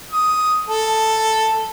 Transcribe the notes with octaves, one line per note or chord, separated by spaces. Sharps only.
D#6
A4